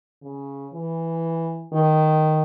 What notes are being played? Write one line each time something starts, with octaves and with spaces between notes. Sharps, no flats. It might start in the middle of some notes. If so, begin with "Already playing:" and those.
C#3
E3
D#3